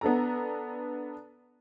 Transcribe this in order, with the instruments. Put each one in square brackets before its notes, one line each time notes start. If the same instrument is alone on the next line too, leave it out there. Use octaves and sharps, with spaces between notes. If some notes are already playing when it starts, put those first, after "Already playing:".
[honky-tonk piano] B3 D4 A4 A#5